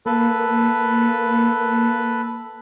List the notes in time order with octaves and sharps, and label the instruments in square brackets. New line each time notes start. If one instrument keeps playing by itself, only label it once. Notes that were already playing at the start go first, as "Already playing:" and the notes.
[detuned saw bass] A#3 [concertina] A4 B4